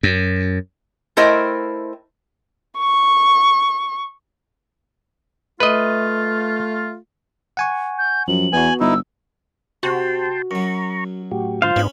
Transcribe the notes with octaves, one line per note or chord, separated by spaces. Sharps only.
F#2
A3 E4 A#4 C5 D#5 G5
C#6
A3 F4 B4 D#5
F#5 G#5 C#6
G6
F#2 F3 F#7
E2 B3 F#4 G#5
G1 D#4 E4 E6
C3 F#4 G5 A5 C6
F#2 F#3 A#5 C#6
A2 F#4 G4
G#2 D3 F4 C5 F5
G#2 B3 C#4 D4 B5